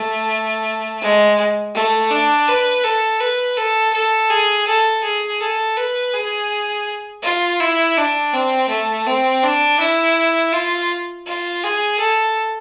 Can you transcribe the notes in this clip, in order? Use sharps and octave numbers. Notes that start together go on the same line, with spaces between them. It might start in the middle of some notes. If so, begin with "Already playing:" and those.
Already playing: A3
G#3
A3
D4
B4
A4
B4
A4
A4
G#4
A4
G#4
A4
B4
G#4
F4
E4
D4
C4
A3
C4
D4
E4
F4
F4
G#4
A4